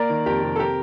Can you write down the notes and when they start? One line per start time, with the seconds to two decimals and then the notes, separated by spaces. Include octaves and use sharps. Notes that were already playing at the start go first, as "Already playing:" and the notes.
Already playing: A#3 A#4 D5
0.09 D#3
0.26 F2 G4 A#4
0.43 C3
0.56 A4
0.59 G4 A#4